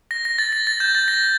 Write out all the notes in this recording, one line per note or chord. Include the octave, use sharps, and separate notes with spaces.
A#6
A#6
A6
A#6
A6
G6
A6
A#6